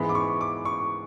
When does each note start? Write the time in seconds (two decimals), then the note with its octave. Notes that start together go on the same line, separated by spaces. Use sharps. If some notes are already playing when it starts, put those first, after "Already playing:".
Already playing: G#2 E3 G#3 B3 B5
0.09 D6
0.15 C#6
0.41 D6
0.65 C#6